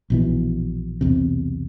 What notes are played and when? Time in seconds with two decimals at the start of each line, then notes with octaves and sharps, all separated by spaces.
0.10 A#1 B2 E3
1.01 B1 E2 C3